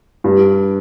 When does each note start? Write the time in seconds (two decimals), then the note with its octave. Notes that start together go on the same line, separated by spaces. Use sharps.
0.24 G2